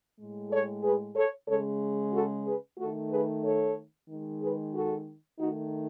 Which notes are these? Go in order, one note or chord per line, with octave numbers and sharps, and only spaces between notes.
A2 G#3
A4 C#5
G#4 B4
A4 C#5
C#3 G#3 A4 C#5
F#4 A4
G#4 B4
D#3 A3 F#4 A4
G#4 B4
A4 C#5
D#3 G#3
G#4 B4
F#4 A4
D#3 A3 D#4 F#4